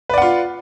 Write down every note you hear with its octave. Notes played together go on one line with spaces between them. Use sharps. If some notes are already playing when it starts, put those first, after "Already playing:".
F4 B4 D5 F#5